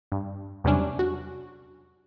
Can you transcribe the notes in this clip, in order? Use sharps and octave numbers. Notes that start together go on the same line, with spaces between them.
G2
E2 C3 F#3 G3 C#4 D4
F#4